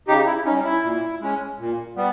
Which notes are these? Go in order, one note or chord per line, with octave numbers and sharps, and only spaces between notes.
C#3 D#4 G4
E4
C#4 D#4
G3
E4
A#2
G#3 C#4
A#2
G3 B3